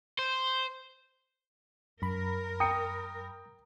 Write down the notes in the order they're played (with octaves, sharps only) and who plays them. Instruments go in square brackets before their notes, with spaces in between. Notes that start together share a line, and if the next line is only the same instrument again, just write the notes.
[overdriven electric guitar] C5
[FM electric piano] F#2 B5 [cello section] A#4
[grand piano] G5 A#5 C#7 [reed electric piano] D#6